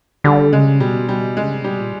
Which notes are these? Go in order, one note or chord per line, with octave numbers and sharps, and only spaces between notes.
D3 G3
C#3 G#3
B2 G3
G3
C#3 G#3
C3
B2 G3
A#2